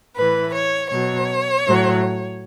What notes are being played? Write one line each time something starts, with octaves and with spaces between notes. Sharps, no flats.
A2 E3 B4
C#5
B2 F#3 C#5
A2 F#3